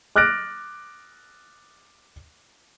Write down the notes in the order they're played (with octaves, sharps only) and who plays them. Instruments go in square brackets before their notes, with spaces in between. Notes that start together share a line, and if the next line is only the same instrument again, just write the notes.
[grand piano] D6 F6 F#6 A6 A#6 D7